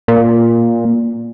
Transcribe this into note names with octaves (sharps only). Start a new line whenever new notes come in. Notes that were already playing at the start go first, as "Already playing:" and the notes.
A#2